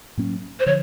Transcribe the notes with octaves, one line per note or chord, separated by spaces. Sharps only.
A2 F#3 A#3 C#4
C5
D3 F3 C#5